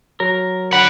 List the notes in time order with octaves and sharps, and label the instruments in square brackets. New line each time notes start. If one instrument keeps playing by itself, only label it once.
[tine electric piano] F#3 [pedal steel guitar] A#4
[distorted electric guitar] D4 F#5 [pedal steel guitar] B5